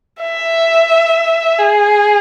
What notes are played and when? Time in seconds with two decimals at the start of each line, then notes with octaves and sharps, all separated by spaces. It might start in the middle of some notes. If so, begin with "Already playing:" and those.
0.21 E5
1.58 G#4